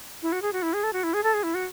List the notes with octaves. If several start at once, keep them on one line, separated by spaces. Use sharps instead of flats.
E4
F#4
G#4
F#4
E4
G#4
A4
F#4
E4
G#4
A4
G#4
E4
F#4